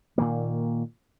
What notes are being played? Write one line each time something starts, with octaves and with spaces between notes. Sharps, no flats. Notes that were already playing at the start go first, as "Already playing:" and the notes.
A#2 D#3 A#3